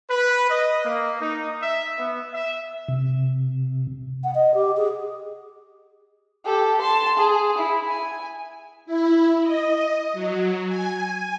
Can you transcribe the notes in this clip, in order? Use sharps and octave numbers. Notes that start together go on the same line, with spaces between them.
B4
D#5
A#3
D#4
E5
B3
E5
C3
F#5
D#5
G4
G#4
G4 A4
A5 C6
G#4
E4
G#5
E4
D#5
F#3
G#5